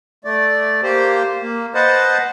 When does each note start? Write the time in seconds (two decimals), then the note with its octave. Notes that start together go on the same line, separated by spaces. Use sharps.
0.25 A3 D5
0.83 A#3 G4 C5
1.42 A#3
1.75 B4 C5 D#5 F#5 A5